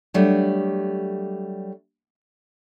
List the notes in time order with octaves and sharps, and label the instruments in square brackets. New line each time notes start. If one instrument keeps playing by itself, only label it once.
[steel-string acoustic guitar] F#3 G3 A3 D4